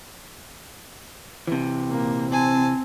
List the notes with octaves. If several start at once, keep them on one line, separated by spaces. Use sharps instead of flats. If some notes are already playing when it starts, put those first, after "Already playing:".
C3 E3
A#2 A#3
C4 G#5 A5